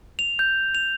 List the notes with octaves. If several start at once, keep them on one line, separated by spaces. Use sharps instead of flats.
F7
G6
F7